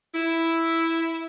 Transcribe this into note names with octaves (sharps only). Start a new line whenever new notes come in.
E4